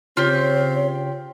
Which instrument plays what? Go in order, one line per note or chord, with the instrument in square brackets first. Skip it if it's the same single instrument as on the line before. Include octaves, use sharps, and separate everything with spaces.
[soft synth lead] C#3 [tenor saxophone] C4 [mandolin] F4 G4 [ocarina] C#5